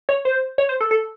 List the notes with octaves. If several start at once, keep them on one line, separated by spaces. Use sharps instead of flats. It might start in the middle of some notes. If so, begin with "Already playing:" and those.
C#5
C5
C#5
C5
A4
A4